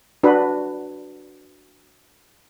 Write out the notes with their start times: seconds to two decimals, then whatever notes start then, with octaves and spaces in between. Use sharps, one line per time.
0.23 D4 F#4 B4